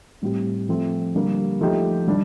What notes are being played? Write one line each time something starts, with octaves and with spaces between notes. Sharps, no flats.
A2 G3 C4 G4
F3 A3 C4
D3 G3 A#3
F3 A3 D#4 G4
D#3 G3 D4